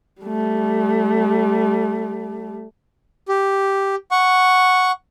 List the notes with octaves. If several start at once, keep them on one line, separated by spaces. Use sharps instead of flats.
G3 A3
G4
F#5 C#6